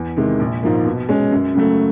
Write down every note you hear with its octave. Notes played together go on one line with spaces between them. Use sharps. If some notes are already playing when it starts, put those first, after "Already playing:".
Already playing: E2
C3 D#3 G#3
A#1
G#2 F3 A#3
B2
G#3 C#4
F#2
C#3 F#3 A3